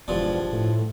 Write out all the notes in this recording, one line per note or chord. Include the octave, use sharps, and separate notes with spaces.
E1 G2 F3 D4
A2